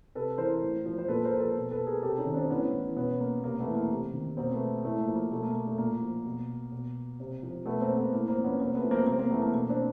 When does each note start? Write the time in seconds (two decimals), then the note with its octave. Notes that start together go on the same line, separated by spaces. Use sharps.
0.15 C3 A4 B4
0.38 E3 A#4 C5
0.62 A2
0.86 F3
0.98 C5
1.08 A#2 A4 B4
1.25 A#4 C5
1.33 F3
1.40 A4 B4
1.56 B2
1.71 A4 B4
1.87 G#4 A#4
2.02 C3 G4 A4
2.18 C#4 D#4
2.26 D#3
2.34 C4 D4
2.50 A2 B3 C#4
2.74 E3
2.96 B2 B3 C#4
3.20 A#3
3.44 C3 A#3
3.60 A3 B3
3.67 E3
3.75 A#3
3.91 C3
4.13 D#3
4.37 B2 A#3 C4
4.53 A3 B3
4.85 A2 A3
5.01 A#3
5.08 F3
5.15 A#3
5.31 B2 A3
5.43 A#3
5.55 A#3
5.67 A3
5.78 A#2 A#3
6.02 F3
6.26 B2
6.72 B2
7.20 C3
7.43 F3
7.65 B2 A3 B3
7.81 A#3 C4
7.97 A3 B3
8.12 A2 A#3
8.28 A#3 C4
8.36 F3
8.44 B3 C#4
8.60 C3 A#3 C4
8.75 A3 B3
8.84 F3
8.91 A#3 C4
9.06 C3 A#3 C4
9.18 A#3 C4
9.31 E3 A3 B3
9.42 A#3
9.54 B2 A#3
9.69 C4 D4